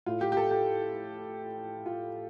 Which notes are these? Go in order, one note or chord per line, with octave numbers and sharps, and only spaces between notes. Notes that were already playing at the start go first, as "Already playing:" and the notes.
A2 F4
G4
G4
A4
G4
F4